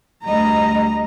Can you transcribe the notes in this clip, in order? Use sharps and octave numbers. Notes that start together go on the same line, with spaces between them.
D2 G3 D#5 A#5